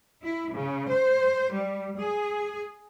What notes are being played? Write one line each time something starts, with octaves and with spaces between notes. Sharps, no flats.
E4
C#3
C5
G3
G#4